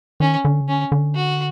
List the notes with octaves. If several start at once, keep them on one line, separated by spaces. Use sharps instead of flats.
D#3 C#4
D3
C#3
D3 C#4
D3
F#4